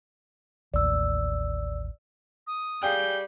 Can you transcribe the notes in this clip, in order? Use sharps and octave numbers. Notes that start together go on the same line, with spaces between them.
A1 D#2 D5 E6
D#6
G3 G#4 F5 G5 G6